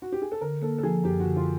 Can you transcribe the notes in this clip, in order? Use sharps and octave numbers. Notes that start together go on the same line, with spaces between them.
F#4
G4
G#4
A4
D3 A#4
A#3 A4
A4
F3 G#4
F#2 G4
F#4
D3
F4